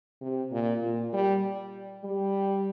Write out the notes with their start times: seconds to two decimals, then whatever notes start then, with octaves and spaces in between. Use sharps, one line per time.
0.22 C3
0.52 A#2
0.82 A#2
1.13 G3
2.04 G3